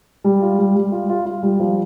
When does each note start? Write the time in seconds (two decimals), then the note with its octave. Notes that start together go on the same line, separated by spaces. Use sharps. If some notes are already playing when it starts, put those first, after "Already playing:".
0.24 G3
0.42 F4
0.59 G3
0.76 G3
0.92 F4
1.09 F4
1.26 F4
1.43 G3
1.60 F3